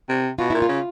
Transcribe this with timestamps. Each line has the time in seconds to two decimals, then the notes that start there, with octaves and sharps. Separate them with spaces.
0.09 C3
0.39 B2 F4
0.50 A#2 E4
0.62 F4
0.69 C#3